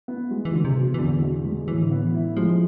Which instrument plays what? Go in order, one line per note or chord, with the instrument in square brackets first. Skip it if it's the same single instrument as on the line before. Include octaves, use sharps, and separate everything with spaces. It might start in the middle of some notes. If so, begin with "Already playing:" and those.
[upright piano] B3
G#3
[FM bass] E3
[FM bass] D3 [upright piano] G#3
[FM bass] C3
[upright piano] B2
[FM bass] E3
[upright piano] E2 [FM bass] D3
[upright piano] B2
G#3
[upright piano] A2 [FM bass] E3
[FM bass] D3
[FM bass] E3 [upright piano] B3
[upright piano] E4
[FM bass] F3 [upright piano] G#3